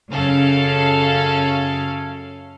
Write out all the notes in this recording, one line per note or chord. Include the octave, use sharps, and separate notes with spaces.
F#2 C#3 C#4 A4 F5